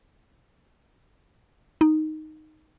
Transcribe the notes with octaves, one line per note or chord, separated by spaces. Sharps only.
D#4